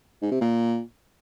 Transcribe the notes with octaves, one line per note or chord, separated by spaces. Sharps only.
G#2
C3
A#2